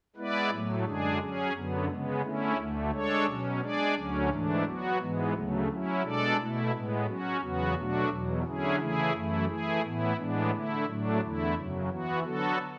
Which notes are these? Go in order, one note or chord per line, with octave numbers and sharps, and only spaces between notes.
G#3 B3 E4 B4 D5
A2 F#3 A3
F#2 D3 G#3 D4 G#4
F#3 C#4 G#4
F#2 D3 F#3 B3
C#3 G#3 B3
D3 A3 C#4 E4
D2 D3 A3
G#3 D4 A4 C#5
B2 F#3 C#4
G#3 D4 G#4 D5
D2 D3 F#3 C#4
G#2 E3 A3 D4
F#3 B3 F#4
G#2 E3 G#3 B3
D2 C#3 F#3 A3
F#3 C#4 E4
B2 G#3 D4 A4 D5
B2 A3 E4
A2 G#3 B3
F#3 C#4 F#4
E2 C#3 F#3 B3 F#4
B2 F#3 A3 D4 F#4
E2 B2 F#3
D3 F#3 C#4 E4 G#4
C#3 E3 A3 E4 G#4
F#2 E3 A3 E4
E3 A3 E4 G#4
A2 E3 B3 E4
A2 E3 G#3 B3 D4
D3 A3 E4
A2 F#3 A3 D4
E2 D3 A3 E4
F#2 C#3 F#3
E3 B3 F#4
D3 F#3 B3 F#4 A4